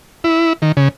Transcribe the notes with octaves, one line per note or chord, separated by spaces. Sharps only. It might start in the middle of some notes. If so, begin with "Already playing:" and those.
E4
D#3
C#3